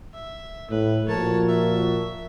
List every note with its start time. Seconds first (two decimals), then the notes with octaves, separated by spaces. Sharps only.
0.14 E5
0.71 A2 B4
1.08 A#2 F3 F#4 A#4 C#5 A5
1.49 E5